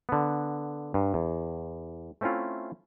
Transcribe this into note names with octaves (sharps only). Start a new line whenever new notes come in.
D3 B3
G2
E2
A3 C4 C#4 E4 F4